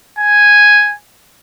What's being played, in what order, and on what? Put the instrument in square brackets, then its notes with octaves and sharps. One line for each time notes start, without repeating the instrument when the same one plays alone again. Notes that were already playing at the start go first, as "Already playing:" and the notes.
[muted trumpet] G#5